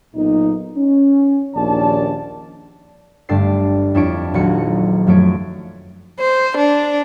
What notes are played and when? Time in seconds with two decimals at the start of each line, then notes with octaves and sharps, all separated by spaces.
0.15 B1 A#2 D#4
0.76 C#4
1.55 A#1 D#2 D#3 C#4 D5 A5
3.29 G1 G2 A3 A4 D5 C7
3.94 F2 D4 E4 C#5 C#6 D7
4.34 D#1 A#1 F#3 F#4 C#7
5.07 F#2 F3 F#3 A3 C#5 D7
6.20 C5
6.57 D4